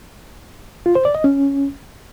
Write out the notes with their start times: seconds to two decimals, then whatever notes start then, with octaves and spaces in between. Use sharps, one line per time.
0.86 F4
0.95 C5
1.05 D5
1.15 D#5
1.24 C#4